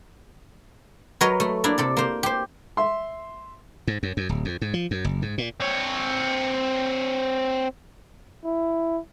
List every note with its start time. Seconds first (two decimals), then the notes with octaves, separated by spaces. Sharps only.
1.21 F#3 A#4 B4 C#5 D#5
1.40 A3
1.64 A#3 D4 E4
1.78 C3 A4 D5
1.97 A#3 C5
2.23 G4 C5
2.77 E5 C6
3.87 G#2
4.03 F#2
4.17 F#2
4.29 D1
4.45 F2
4.61 G#2
4.74 F3
4.91 F#2
5.04 F#1
5.22 G#2
5.38 A#2
5.60 C4 C#5
8.45 E4